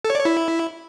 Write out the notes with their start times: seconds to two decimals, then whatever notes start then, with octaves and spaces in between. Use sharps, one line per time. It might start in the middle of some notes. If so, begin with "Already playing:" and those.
0.05 A4
0.10 C#5
0.15 D5
0.20 C#5
0.25 E4